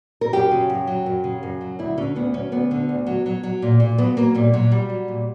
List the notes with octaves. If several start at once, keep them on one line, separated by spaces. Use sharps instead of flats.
A#4
F#2 G4
C#3
F#2
F#3
F#2
C#3
F#2
F#3
D2 E4
D3 C#4
D2 B3
F#3 C#4
D2 B3
D3
D2
F#3
F#3
F#3
A#2
A#2
F#3 B3
F#3 A#3
A#2 G3
A#2 F#3
F#3 G3
F#3
A#2